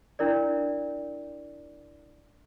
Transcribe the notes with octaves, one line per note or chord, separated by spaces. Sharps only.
D4 E4 A#4 D5